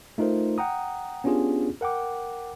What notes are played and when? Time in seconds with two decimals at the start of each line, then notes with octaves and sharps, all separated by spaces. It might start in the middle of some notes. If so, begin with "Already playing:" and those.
0.18 A3 D#4 F4 A#4 C5
0.58 F#5 G5 A#5 D#6
1.24 B3 C#4 D4 F4 G4 G#4
1.81 A#4 F#5 G5 D6